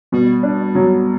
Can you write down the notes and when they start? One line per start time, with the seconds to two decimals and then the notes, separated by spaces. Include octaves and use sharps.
0.12 B2 G3
0.43 D4
0.75 F#3